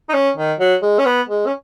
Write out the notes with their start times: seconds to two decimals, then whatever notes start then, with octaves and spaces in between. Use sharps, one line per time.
0.09 D#4
0.14 C#4
0.37 D#3
0.59 F#3
0.83 G#3
0.99 C#4
1.06 B3
1.29 G#3
1.47 C#4